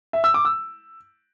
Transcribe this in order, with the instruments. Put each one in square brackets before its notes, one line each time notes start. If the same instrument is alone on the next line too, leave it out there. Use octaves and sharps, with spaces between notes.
[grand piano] E5
E6
D6
E6